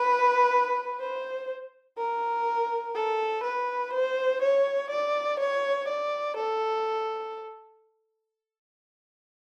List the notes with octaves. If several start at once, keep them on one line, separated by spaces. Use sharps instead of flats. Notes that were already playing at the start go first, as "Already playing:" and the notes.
Already playing: B4
C5
A#4
A4
B4
C5
C#5
D5
C#5
D5
A4